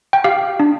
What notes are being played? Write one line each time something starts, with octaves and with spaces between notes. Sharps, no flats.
G5
G4 F5
D4